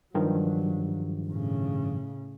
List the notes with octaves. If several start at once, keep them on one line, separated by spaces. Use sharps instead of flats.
G2 D#3 F3 F#3
A2 C#3